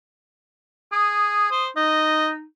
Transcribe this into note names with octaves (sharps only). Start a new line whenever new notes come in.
G#4 D#6
C5
D#4 D#5